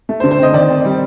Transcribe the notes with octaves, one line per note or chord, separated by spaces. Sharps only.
A3
C5
D3
C5
C4 D#5
D#3 D5
C4
G3